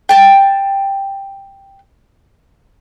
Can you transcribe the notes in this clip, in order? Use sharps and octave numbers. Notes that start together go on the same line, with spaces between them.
G5 A5